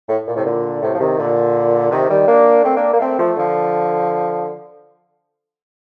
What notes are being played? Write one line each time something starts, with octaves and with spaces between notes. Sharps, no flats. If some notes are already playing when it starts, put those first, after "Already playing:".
A2
A#2
A2 C3
A#2 D3
A2 C3
F3
C3 D#3
A#2 D3
C3 D#3
D#3 G3
A#3 D4
A3 C4
A#3 D4
A#3
A3 C4
F3 A3
D3 F3